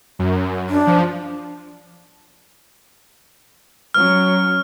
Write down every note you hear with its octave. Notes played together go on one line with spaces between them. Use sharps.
F#2
D4
F3
F#3 C#4 F6